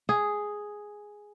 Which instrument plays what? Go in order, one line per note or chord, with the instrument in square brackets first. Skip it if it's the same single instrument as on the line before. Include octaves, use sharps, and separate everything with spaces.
[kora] G#4